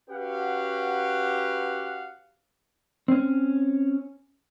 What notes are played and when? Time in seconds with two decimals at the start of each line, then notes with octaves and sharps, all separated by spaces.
0.10 C#4 F#4 G4 B4 F5 F#5
3.08 C4 C#4